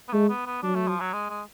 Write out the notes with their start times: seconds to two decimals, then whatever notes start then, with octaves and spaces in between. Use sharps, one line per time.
0.09 B3
0.13 G#3 A3
0.29 B3
0.46 B3
0.63 F#3 D4
0.75 A3
0.88 F3
1.00 F#3
1.13 G#3
1.30 G#3